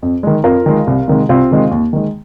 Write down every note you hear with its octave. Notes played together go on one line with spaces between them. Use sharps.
F2
D#3 G#3
F2 F4 A#4
D#3 G#3
C2
C3 D#3 G#3
C2 C4 F4
C3 D#3 G#3
D#2
D#3 G#3